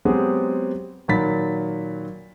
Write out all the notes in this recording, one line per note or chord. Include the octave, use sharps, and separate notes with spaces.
F#3 G#3 B3 C4 G4 G#4
A#2 D#3 F#3 B5 A6 B6